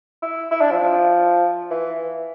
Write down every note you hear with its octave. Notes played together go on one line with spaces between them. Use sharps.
E4
E4
D4
F3
F3
E3